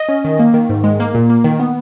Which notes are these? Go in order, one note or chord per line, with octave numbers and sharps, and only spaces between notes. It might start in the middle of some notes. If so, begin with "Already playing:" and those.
Already playing: D#5
C#4
D#3
A#3
D#3
G#2
G#3
A#3
A#2
A#3
D#3
B3